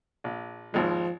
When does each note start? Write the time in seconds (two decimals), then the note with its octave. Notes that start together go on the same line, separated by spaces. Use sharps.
0.24 A#1
0.74 G#1 D#2 F3 G#3